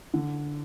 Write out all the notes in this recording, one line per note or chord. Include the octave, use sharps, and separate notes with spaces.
D3